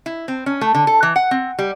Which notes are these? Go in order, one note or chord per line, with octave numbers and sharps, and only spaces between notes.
E4
C4
C#4
A3
D3
A4
E3
F#5
C4
G3